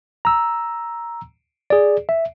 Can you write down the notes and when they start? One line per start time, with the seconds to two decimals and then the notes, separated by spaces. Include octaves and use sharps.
0.25 A#5 E6
1.70 G#4 D5
2.09 E5